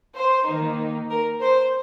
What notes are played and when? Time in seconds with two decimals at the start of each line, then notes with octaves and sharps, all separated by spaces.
0.16 C5
0.47 D#3 A#3 D#4
1.10 A#4
1.41 C5